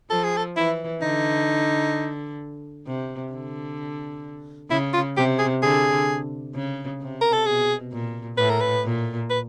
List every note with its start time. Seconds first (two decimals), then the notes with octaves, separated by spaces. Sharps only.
0.10 F3 A4
0.23 G#4
0.37 A4
0.57 E3 E4
1.02 D3 D#4
2.87 C3
3.33 D3
4.70 C#3 E4
4.93 F4
5.16 C3 G4
5.39 G#4
5.63 D3 G#4
6.55 C#3
7.00 C3
7.21 A#4
7.33 A4
7.46 B2 G#4
7.92 A#2
8.38 A2 B4
8.50 A#4
8.61 B4
8.84 A#2
9.30 B4